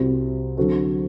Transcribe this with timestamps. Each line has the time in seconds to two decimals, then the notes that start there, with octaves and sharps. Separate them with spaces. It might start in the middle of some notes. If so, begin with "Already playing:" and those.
Already playing: C2 C3 G3 C4 F#4
0.57 D3 F#3 C4 F#4 A4